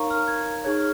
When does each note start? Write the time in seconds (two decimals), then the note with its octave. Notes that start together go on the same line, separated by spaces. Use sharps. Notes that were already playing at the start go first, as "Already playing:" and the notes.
Already playing: D#4 A#4 C#5 F5 A#5 C#6
0.10 F6
0.27 G#6
0.64 D#4 G#4 C#5 G#6
0.78 F6